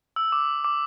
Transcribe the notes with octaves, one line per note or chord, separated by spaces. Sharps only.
E6
D6
D6